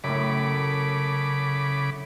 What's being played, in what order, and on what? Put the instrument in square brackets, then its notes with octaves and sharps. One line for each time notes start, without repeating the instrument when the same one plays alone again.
[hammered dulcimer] F#2 A2 [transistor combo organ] C#3 B5 D6